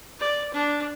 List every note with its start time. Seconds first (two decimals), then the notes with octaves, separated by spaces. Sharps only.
0.20 D5
0.54 D4